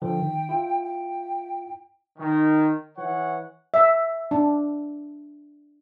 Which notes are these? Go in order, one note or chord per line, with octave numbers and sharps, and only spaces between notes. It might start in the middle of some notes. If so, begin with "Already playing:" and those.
D3 F3 G5
D#3
E4 F4
G5
D#3
E3 C#5 F#5
E5
D4